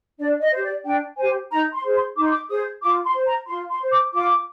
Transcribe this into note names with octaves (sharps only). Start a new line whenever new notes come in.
D4 D5
D#5
G4 C5
D5
D4 G5
G4 C5 G#5
D#4 A#5
C6
G#4 C5
C6
D#4 D6
C6
D6
G#4 C5 D#6
F4 D6
C6
C5
A#5
F4 C6
C6
C5
D6
F4 D6